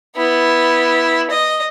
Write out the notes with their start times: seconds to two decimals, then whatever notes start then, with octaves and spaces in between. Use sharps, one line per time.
0.17 B3 E4
1.30 D#5